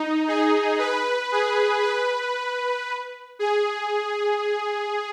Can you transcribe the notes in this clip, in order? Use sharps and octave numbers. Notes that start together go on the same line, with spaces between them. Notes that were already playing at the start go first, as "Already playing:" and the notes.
Already playing: D#4
G#4
B4
G#4
B4
G#4